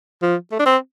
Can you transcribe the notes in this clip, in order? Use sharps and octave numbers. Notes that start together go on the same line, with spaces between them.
F3
A3
D4
C4